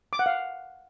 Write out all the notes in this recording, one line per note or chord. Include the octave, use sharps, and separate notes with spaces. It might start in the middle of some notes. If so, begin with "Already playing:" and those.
D6
F#5
F5